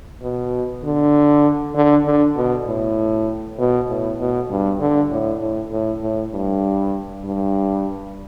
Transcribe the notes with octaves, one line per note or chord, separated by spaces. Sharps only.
B2
D3
D3
D3
B2
A2
B2
A2
B2
G2
D3
A2
A2
A2
A2
G2
G2